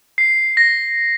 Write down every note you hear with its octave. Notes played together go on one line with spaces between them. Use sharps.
C7
A#6